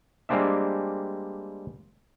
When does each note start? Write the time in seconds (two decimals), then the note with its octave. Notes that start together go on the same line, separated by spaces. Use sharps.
0.29 G3 G#3 A#3 C4 D4 E5